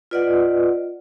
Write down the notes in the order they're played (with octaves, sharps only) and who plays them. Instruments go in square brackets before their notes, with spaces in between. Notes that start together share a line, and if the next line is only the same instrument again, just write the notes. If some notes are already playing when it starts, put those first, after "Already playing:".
[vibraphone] F4 B4 D5 D#5 F#5